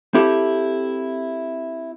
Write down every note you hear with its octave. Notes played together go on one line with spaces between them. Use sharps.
C4 E4 G4 A4